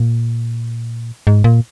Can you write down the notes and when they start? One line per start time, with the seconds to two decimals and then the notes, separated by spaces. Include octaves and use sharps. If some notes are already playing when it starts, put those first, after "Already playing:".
Already playing: A#2
1.27 G#2
1.44 A#2